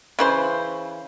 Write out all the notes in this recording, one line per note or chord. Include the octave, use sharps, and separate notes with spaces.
C#3 E3 C5